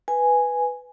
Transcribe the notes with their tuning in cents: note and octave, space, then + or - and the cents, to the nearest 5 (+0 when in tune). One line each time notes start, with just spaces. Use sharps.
B4 +0 G#5 +0